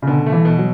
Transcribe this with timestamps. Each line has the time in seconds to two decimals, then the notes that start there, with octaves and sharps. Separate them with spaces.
0.02 C#3
0.07 B2 D3
0.26 A3
0.32 E3
0.45 B2
0.58 F#3